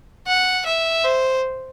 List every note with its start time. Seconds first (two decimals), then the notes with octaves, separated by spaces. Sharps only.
0.27 F#5
0.66 E5
1.04 C5